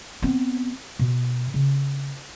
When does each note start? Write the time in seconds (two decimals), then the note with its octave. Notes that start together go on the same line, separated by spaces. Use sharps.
0.22 B3 C4
0.99 B2
1.54 C#3